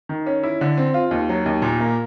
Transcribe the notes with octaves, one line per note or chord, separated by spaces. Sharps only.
D#3
C#4
E4
D3
C4
F4
D#2
F#3
D#2
A#2
A#3